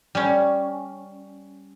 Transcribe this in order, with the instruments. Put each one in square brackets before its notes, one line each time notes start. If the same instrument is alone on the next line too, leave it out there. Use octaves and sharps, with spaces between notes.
[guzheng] G3 C#4